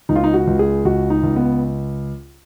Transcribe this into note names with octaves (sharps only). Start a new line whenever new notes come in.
C#2 D#4
F4
D#4
F#4
C#2
G#4
C#2 F#4
D#4
C#2
B3